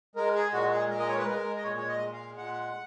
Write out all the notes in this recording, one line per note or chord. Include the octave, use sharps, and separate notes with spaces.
G#3 A#4
G#4
A#2 F#4
G#4
G#3 A#4
D#5
C#5
B4
G#3 A#4
D#5
A#2 C#5
C#5
D#5
G#3
F5
A#2 F#5